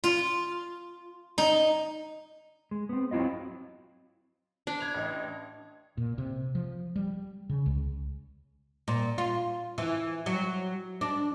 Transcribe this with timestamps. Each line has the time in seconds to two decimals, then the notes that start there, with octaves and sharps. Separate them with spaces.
0.04 F4
1.38 D#4
2.71 G#3
2.89 B3 C4
3.11 F#3 C4 E4 F4 D#5
4.67 D4
4.80 G#6 F7
4.95 A1 D#5
5.97 A#2
6.18 C3
6.55 F3
6.96 G3
7.50 C#3
7.66 C#2
8.88 A#2
9.18 F4
9.78 E3
10.26 F#3
11.01 D4